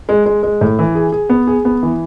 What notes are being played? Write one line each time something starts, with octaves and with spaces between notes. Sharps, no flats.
G#3
G#3
G#3
A2
E3
G#4
G#4
B3
G#4
B3
E3